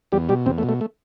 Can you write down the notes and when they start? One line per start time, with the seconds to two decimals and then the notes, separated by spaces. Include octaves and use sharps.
0.12 E2 G3 G4
0.29 B2 G3 G4
0.46 E2 C3 C4
0.58 A3
0.63 B2
0.69 A3
0.81 A3